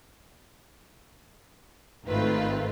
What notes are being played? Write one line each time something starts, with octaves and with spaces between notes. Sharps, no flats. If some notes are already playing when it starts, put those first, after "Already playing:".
G#1 D#3 A3 C4 F4 B4